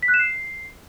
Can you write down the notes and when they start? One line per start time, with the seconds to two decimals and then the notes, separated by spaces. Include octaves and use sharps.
0.03 B6
0.08 F#6
0.14 E7
0.19 C7